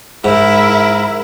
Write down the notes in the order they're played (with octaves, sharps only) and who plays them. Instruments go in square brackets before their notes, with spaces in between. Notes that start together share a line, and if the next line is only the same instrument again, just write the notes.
[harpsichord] G#2 [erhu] E4 [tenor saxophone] A#4